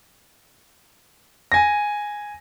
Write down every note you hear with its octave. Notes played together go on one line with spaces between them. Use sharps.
G#5 A#6